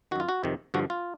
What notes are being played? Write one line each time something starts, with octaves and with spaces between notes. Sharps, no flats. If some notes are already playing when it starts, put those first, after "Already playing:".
F#2 D#3 F4 F#4
F#4
F2 C3 D#3
G2 D3 F3 F#4
F4